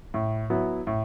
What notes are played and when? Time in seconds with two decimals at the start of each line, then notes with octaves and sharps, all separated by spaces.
0.14 A2
0.50 F#3 B3 E4
0.87 A2